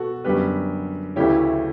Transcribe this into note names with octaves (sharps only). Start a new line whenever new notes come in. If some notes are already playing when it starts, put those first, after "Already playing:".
Already playing: B2 F#4 A4
F#2 D3 G3 B3 G4 B4
D2 C#3 E3 A3 C#4 E4 G4